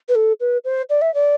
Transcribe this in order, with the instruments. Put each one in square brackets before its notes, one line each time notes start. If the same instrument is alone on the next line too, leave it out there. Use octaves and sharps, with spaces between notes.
[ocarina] B4
A4
B4
C5
D5
E5
D5